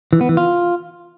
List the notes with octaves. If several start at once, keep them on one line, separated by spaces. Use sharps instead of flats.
E3
B3
E3
F4